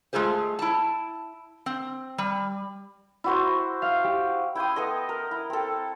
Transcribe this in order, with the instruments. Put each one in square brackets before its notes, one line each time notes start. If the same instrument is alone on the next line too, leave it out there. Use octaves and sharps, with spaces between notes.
[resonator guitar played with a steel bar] G#3 A3 F4 G#4 C5
E4 A5
C4
G3
[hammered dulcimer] E4 F#4 C5
[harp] F5
G4
[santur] E4 G5 C6 D#6
B3 A4 D#5
A#4
E4
C4 A4